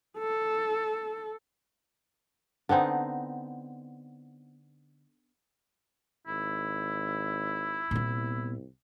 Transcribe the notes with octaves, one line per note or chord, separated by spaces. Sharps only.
A4
D3 B3 C4 D#4
G#1 E4
C2 A#2 B3